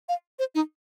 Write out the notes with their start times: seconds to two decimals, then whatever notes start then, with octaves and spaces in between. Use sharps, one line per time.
0.09 F5
0.39 C5
0.55 D#4